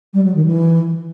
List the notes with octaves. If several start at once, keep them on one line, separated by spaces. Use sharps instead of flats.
G3
F#3
D#3
E3